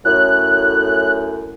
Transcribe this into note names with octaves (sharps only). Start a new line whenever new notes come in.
F#2 A2 F#6